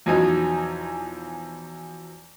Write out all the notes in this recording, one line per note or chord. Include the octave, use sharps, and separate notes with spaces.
E2 B2 F3 F#3 D#4 G#5